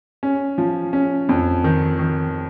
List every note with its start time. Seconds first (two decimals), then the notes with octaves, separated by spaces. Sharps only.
0.23 C#4
0.58 F3
0.93 C#4
1.29 F2
1.64 D#3
1.99 D#3